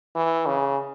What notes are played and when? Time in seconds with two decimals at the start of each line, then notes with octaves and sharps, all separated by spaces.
0.16 E3
0.46 C#3